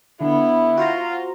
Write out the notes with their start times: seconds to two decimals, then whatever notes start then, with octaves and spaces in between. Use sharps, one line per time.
0.21 D3 B3 E4
0.77 F4 F#4 C5 A#5